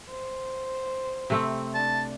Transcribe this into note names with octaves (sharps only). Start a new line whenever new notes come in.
C5
C3 A3 C4
D4 A5